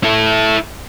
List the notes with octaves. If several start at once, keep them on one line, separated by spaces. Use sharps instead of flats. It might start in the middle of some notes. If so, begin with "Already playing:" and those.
E4 A4